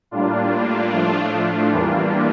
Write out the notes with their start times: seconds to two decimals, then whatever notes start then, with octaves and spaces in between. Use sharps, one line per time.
0.11 A2 G3 A#3 D4 F4
0.92 A2 F3 A3
1.72 E2 E3 G3 A#3